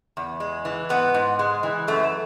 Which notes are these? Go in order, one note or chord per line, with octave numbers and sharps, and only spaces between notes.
E2
G#3
E3
G#2 B3
G#2
G#3
E3
F#2 A3